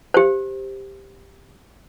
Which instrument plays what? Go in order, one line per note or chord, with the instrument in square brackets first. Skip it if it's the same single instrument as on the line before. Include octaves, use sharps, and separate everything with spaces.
[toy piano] G4 C5